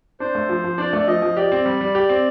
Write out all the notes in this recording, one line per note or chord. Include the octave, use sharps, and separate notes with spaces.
D4 C5
A3
F3
F3
D4 D5
A3
D5
F3 D#5
F3
G4 D5
C4
G3
G3
G4
C4